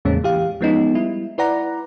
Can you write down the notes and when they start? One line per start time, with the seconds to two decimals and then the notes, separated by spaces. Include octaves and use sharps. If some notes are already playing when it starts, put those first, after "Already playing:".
0.05 E2 A2 C#3 G#3 A#3 C#4
0.24 E3 G4 F5
0.61 F3 G#3 B3 C#4 D#4
0.95 G3 E4
1.38 E4 B4 D5 F#5 A#5